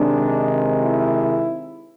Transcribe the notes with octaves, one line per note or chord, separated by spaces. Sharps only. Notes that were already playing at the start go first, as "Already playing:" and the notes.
Already playing: C3 D#3 G#3 D4
E4